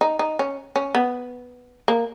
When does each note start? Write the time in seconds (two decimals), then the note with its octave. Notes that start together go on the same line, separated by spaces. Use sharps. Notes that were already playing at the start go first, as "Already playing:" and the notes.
0.01 D#4
0.19 D#4
0.39 C#4
0.76 C#4
0.95 B3
1.88 A#3